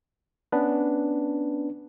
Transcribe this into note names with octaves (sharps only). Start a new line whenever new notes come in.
B3 C#4 D4 B4